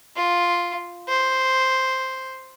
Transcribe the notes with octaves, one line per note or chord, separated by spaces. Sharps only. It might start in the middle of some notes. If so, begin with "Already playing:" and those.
F4
C5